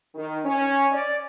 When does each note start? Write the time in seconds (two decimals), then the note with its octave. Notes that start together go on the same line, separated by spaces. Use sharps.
0.15 D#3
0.44 C#4
0.93 D5